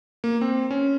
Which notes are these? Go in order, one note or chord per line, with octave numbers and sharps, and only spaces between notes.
A#3
C4
C#4